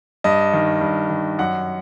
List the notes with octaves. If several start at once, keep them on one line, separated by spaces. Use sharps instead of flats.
G2 D#5
D#3
G2
D#3
F#2 F#5